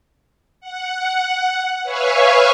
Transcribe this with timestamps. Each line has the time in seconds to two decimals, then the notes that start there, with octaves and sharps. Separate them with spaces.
0.61 F#5
1.83 B4 C#5 E5 F5 G#5 C#6